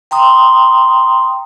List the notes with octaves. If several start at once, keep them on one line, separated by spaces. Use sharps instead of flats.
G5 A#5 C6 D#6